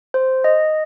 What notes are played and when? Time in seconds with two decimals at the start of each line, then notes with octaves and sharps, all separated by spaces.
0.14 C5
0.44 D#5